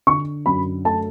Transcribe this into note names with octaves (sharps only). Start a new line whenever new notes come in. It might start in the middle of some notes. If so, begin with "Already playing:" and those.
D3 C#6
F#2 B5
A3 A5